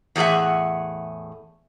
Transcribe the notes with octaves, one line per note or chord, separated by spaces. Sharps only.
E2 A2 G#4 E5 F#5